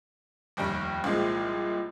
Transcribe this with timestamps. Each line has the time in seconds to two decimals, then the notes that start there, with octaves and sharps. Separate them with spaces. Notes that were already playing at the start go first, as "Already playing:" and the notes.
0.57 F1 D#2 G3 G5
1.04 C2 A#2 F3 G#3